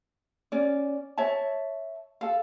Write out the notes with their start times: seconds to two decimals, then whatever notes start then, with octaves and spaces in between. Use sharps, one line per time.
0.52 C#4 D5
1.18 C#5 E5 A5
2.21 A4 F5